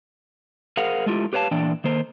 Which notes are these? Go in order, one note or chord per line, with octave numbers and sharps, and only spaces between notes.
G#4 A#4 C5 F5 F#5
G#3 A3 E4 F4 G4
G4 B4 C#5 F5 A5
A#2 E3 D4 D5 G5
D#3 A#3 C5